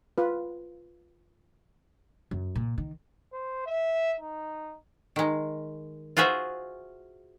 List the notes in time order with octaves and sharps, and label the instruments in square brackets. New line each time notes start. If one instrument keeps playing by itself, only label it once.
[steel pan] F4 B4
[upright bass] F#2
A#2
D#3
[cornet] C5
E5
D#4
[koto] D#3 G#3
F4 F#4 G#4 C5 E5